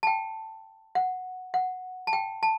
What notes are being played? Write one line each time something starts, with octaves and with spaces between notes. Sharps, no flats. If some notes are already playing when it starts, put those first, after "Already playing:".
A5
G5
F#5
F#5
A5
G5
A5